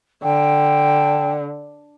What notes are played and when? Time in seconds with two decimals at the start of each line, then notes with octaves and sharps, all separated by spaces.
0.23 D3 G5